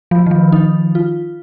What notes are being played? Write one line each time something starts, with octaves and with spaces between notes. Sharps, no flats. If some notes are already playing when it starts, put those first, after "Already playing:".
F3
D#3
F3
D#4
F4